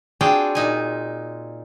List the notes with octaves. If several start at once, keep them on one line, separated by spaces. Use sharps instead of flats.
C4 D4 F4 F#4 G#4 G5
A#2 D#4 G#5